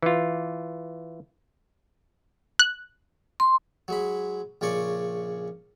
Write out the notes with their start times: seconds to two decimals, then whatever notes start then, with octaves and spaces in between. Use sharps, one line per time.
0.03 E3 F4
2.59 F#6
3.40 C6
3.88 F#3 G#3 B5
4.61 A#1 C#3 C#4 D5 C#6